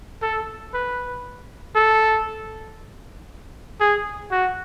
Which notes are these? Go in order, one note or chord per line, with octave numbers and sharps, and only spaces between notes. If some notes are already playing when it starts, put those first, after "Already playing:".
A4
B4
A4
G#4
F#4